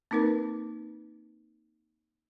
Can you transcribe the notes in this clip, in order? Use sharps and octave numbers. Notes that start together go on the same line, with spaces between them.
A#3 C4 D#4 A#4 B4